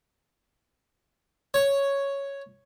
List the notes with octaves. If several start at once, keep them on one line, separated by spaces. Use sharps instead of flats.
C#5